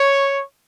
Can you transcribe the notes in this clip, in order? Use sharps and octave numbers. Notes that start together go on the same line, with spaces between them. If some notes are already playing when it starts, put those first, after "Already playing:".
Already playing: C#5